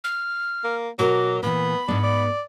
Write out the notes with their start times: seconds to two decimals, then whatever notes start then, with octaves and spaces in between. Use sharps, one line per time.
0.04 F6
0.64 A#3
0.99 B2 F#3 F#4 A#4 D6
1.43 A#2 E3 B3 B5
1.88 G#2 B3 D4
2.03 D5